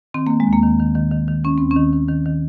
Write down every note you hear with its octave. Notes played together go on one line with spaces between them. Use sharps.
D#3 C4
D#3 A#3
G#3
D#2
A#3
D#3
D#3
D#3
D#3
D#3
D#3 C#4
D#2 C4
C#4
D#3
D#3
D#3
D#3